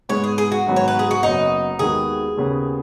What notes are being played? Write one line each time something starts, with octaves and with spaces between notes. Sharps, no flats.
G#2 G#3 B3 C#5
G#4
G#4
F#4
G#2 D#3 F#3 B3
C#5
B4
G#4
F#4
F#1 F#2 F#3 B3 D#4 F#4
D#2 D#3 G#3 B3 F#4 G#4
D#2 C#3 B3